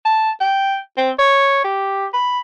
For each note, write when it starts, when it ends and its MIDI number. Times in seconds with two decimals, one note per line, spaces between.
0.05 0.31 81
0.41 0.78 79
0.98 1.11 60
1.19 1.62 73
1.64 2.06 67
2.13 2.40 83